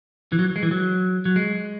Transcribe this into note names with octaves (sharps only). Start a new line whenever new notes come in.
E3
F#3
G#3
E3
F#3
F#3
G#3